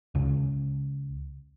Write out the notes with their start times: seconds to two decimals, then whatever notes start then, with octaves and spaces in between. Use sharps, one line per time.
0.15 C#2 C#3